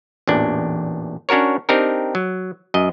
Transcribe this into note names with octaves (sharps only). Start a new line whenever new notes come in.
A1 E2 A#2 D4
C#4 D4 F#4 A#4 C#5
C4 D4 D#4 G4 A#4
F#3
F#2 D#5